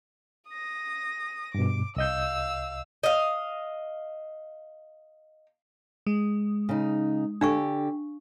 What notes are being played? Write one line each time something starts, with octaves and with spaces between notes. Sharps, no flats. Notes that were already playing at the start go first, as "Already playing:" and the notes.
D#6 A#6
G2 B2 D6
C2 D#5 F5 E6 G6
D#5 F5
G#3
C#3 D#4
D3 D4 G4 F5 C#6